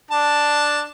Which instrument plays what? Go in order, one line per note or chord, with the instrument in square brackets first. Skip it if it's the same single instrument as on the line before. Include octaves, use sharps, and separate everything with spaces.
[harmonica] D4 A5